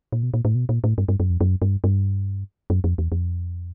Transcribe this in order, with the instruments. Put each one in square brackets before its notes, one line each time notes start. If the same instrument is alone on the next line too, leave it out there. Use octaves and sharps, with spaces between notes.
[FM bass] A#2
B2
A#2
A2
B2
A#2
A2
G2
G2
F#2
F2
F#2
G2
G2
F#2
F2
E2
F2